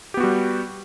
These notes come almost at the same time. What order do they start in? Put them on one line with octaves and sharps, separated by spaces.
G4 B3 F#4 G3